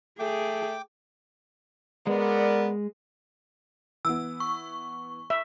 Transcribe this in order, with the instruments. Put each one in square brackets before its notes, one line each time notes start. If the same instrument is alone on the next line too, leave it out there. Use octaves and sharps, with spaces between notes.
[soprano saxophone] A3 [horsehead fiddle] G#4 [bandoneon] G5 D6
[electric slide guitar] G#3 [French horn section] B3 A#4 D5
[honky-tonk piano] E3 B3 [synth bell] E6
[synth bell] C#6
[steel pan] E5